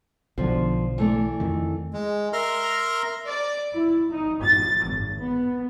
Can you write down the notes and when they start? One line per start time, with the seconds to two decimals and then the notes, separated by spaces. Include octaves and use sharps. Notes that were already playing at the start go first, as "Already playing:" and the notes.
0.38 B1 D3 F3
0.98 E3 A3 D5
1.40 F2 D#3
1.93 G#3
2.33 A#4 E5 A#5 C6 F6
3.25 D5
3.73 E4
4.12 D#4
4.42 A6
4.85 G#1
5.19 B3